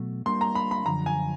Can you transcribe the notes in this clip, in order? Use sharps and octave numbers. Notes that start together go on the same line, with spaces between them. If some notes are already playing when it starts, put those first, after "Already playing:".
Already playing: B2 F#3 A3
G3 A#3 D4 G4 A#4 C6
A#5
B5
B5
F#2 D3 F3 A#5
G#5